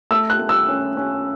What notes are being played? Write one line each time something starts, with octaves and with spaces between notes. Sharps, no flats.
A3 E6
F#6
A3
E6
C#4
C#4